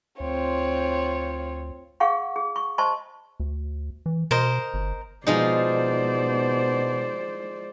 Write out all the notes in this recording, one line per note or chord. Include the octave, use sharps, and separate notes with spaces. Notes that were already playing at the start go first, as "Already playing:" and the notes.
D2 C4 F4 C#5
G#4 F5 F#5 C#6
G#4
C#6
C5 D#5 A5 C6 C#6
D2
E3
B2 A#4 C5 D#5
G1
B2 F3 G#3 D#4 C5 D5